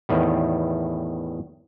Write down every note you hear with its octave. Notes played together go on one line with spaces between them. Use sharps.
E2 A2 D#3 G3